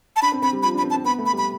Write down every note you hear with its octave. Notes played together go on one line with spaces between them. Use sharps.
A5
D4 B5
C4
C4 B5
G3
F3 B5
D4 B5
C4
A5
C4
B3 B5
A3
B5
G3
B5